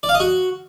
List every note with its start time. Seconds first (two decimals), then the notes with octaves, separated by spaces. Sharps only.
0.03 D5
0.09 F5
0.14 D#5
0.20 F#4